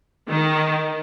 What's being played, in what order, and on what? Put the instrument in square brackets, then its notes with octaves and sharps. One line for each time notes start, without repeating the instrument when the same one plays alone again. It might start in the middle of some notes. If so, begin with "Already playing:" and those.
[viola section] D#3